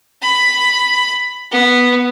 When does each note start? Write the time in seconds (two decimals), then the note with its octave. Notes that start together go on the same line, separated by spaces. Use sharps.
0.22 B5
1.52 B3